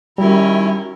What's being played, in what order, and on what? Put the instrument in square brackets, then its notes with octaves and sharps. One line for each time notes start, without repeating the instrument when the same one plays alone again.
[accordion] D#3 E4 [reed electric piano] G3 [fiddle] C#4 A#4 [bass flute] F#4